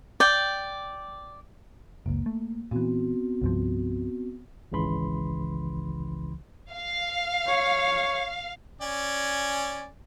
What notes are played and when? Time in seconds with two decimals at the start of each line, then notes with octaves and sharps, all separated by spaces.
0.20 D5 G5
2.06 F#1 C#2 A#3
2.26 A3
2.71 A#2 E3 B3 C4 F#4
3.41 C2 G2 F3
4.72 G#1 C#2 C#3 E3 B5 C6
6.73 F5
7.47 C#5
8.81 C#4 D5 G#5